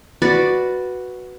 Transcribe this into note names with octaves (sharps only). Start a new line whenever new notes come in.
F#4 B4 D5